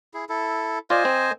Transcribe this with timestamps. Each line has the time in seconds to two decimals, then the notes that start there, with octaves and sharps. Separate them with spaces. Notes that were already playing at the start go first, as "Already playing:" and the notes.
0.14 E4 G#4
0.29 E4 A4
0.90 F4 C5 D5 D#5 G#5
1.05 C4